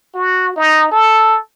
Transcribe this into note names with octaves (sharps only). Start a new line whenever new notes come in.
F#4
D#4
A4